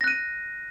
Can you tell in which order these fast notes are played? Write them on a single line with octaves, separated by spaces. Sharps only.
A#6 F#6 D#7